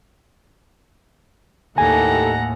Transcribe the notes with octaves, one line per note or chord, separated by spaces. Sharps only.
D#2 A2 E4 G4 A4 F#5 G#5 A#5